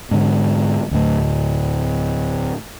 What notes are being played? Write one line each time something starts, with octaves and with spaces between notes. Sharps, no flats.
G#2 D3
D2 A2